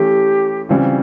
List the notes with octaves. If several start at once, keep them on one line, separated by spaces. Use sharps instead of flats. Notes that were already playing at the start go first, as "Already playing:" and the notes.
Already playing: E3 A3 C#4 E4 G4
C#3 E3 G3 C4 F4